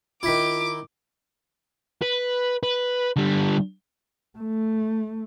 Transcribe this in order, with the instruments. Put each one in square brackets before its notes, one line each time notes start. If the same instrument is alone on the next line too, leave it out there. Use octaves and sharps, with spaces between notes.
[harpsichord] D#3 E4 [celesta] F4 B6 [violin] D6
[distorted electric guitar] B4
B4
D3 G3
[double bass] A3